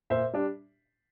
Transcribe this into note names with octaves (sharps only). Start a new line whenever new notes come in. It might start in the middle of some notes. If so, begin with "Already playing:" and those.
A#2 C5 E5
G3 D4